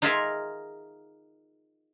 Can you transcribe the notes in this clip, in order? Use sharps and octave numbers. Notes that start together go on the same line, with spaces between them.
D#4 F4 G#4 A#4 E5 F5